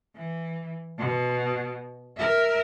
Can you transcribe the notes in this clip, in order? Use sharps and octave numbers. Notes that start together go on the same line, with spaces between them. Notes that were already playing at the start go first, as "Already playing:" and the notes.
E3
B2
A#4 E5